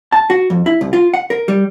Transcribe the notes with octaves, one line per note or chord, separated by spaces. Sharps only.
A5
F#4
F2
E4
C2
F4
F#5
A#4
G3